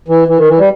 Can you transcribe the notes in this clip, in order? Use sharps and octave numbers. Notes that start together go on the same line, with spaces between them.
E3
E3
D#3
E3
G3